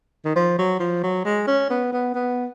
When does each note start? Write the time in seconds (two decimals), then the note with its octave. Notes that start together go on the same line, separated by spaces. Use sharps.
0.25 D#3
0.36 F3
0.58 F#3
0.80 F3
1.03 F#3
1.25 G#3
1.47 C#4
1.70 B3
1.93 B3
2.14 B3